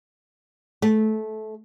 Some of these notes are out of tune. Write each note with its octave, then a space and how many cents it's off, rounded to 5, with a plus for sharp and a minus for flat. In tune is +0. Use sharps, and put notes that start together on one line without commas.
A3 -20